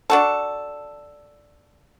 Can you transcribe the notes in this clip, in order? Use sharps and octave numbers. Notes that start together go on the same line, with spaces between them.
D4 F#4 A4